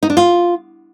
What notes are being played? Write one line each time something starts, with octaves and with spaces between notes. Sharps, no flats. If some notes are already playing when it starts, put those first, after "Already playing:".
D#4
D4
F4